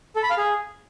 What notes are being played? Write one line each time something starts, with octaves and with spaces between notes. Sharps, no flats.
A4
B5
F5
G#4